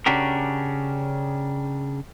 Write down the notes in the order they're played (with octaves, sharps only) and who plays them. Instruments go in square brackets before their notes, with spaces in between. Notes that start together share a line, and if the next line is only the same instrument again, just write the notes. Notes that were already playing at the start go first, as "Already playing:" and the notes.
[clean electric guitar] C#3 C#4 D4 F#4 G4 A#4